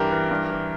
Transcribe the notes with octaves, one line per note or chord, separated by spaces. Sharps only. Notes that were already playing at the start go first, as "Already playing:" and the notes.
Already playing: G2 E3 G4 A#4
E3
G2
E3